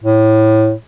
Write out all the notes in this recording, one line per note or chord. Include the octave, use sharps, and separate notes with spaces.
A2